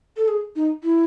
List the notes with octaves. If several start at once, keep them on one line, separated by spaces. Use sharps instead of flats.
A4
G#4
D#4
E4